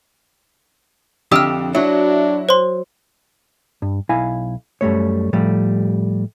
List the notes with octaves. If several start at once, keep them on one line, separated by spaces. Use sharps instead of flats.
F2 D3 G4 E5 D#6 F6
F#3 D4 E4 F#4
C5 C#5 C6
G2
B1 E4 F5 G#5
F#2 G3 A3 C#5
A2 F3 G3 A3 G4